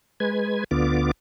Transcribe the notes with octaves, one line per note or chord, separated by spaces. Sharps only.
G#3 B4 G#6
D2 D3 B3 F4 D6